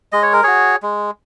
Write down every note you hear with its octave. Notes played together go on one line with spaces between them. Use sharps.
G#3 D#5
C#5
A#4
F#4 G#4 C#5
G#3